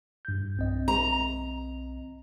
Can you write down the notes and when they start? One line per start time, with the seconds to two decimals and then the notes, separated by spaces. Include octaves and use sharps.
0.25 G2 G6
0.57 B1 C4 D#5
0.88 A#5